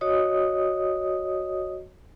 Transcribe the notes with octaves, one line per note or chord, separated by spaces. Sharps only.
F#4 C#5 D#5 D#6